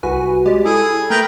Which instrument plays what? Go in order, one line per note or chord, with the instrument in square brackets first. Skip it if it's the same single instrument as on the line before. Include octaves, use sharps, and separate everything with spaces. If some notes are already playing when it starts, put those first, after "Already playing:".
[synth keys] C2 F#4 B4 [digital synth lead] G#5
[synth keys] G#3 D5 [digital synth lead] G4
[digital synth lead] E4 [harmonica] G#4 [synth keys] A4
[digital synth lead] A3 [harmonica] A#4 B4 G5